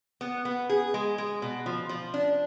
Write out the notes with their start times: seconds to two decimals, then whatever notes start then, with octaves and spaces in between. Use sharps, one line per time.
0.21 B3
0.45 B3
0.69 G#4
0.94 G#3
1.18 G#3
1.42 B2
1.66 F3
1.89 F3
2.14 D4